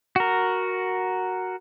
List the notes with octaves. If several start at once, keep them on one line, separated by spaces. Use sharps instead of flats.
F#4 A#4